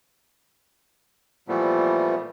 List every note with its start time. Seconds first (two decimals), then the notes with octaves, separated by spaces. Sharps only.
1.48 A#2 E3 F3 G3 A3 B3